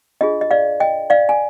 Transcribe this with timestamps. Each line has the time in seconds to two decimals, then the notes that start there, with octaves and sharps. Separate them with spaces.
0.21 D4 F4 G#4 D#5
0.41 D#5
0.51 D5 F5
0.80 D#5 G5
1.10 D5 F5
1.29 G#5